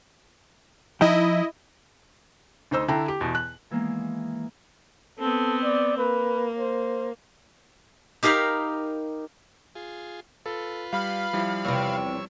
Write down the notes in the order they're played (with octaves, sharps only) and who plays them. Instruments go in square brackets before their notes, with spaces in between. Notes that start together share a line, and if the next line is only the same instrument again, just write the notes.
[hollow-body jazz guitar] F3 D#4 G5 [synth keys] E4 D#5
[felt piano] D2 D#4 C5 E6
D3 E4 G5 A#5
G4
E2 B2
F#6
[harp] D#3 E3 G#3 A#3 B3
[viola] B3 C4 [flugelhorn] A4
[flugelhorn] D5
[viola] A#3 [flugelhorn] B4
[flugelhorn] C5
[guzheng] D#4 G4 A#4 F5 B5
[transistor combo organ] F4 G#4
[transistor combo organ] F4 B4 [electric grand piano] A4
[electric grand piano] G3 [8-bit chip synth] F5 B5 F6
[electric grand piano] F3 G3 E4
[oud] E2 C3 [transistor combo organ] C#5 E6